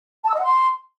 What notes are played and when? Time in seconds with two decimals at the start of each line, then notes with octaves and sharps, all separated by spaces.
0.23 A5
0.28 E6
0.33 D#5
0.38 F#5
0.43 C6